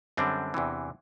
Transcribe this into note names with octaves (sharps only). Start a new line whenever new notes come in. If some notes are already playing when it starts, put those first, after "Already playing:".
F#2 D3 G3 C4 D4
E2 C3 E3